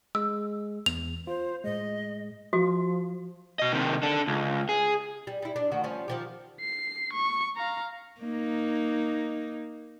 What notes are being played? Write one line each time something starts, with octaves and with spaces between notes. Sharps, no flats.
G#3 E6
E2 F7
F4 C5
A2 G#3 D#5
F3 F#4
B2 D#5
C3 D#3
D4 A4
C#2
G#4
G3
G3 E4
D4
D2 D#3 F#4
F3 G3 C#4
D#3 F3 G4
C7
C#6
F5 A#5
A#3 D#4